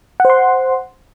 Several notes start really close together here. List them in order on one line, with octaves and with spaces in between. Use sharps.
F#5 C5 C6